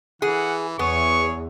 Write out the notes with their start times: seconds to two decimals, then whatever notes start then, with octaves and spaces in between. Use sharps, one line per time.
0.22 E3 G#4 F#5
0.79 E2 B3 G#4 C#5 C#6